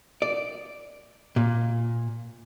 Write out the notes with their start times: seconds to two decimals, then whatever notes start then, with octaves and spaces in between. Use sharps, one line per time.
0.22 D5
1.36 A#2